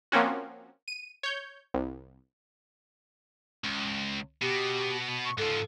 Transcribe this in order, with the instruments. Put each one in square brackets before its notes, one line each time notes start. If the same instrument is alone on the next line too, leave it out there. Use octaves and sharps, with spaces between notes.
[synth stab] F3 A#3 C4 C#4 F#4
D#7
C#5 G6
C2
[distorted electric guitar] C#2
[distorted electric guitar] B2 [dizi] G4
[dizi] C#6
[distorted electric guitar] G#2 F3 [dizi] A4